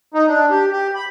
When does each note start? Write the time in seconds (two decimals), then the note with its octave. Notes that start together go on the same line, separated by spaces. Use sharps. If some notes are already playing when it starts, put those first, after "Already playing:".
0.14 D#4
0.28 D4
0.50 G4
0.72 G4
0.95 B5